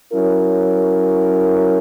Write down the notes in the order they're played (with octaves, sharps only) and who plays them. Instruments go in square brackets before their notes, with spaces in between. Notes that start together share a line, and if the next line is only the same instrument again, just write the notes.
[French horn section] F#3 C#4 E4 A#4